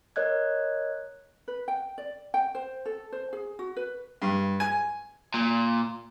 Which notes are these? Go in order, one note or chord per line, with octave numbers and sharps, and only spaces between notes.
A#4 C#5 D#5 F#6 G#6
B4
G5
D5
G5
C5
A4
C5
G#4
F#4
B4
G2
G#5
A#2